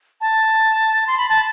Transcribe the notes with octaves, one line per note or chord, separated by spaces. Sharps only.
A5
C6
B5
A5